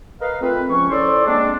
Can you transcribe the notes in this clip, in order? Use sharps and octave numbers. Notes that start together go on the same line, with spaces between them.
A#4 B4 D#5 F5
A3 C4 F4 B4
C#2 F3 C#4 C#6
C#4 E4 A4 C5 D5
G#3 A#3 C4 D4